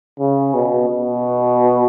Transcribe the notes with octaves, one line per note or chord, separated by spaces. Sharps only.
C#3
B2
B2